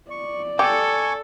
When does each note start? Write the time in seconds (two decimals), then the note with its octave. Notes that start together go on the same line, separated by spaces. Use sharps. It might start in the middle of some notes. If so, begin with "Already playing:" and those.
0.11 D5 C#6
0.59 G4 A4 G#5 C#6